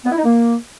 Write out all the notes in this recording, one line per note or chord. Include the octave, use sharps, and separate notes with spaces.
B3
E4
D#4
A#3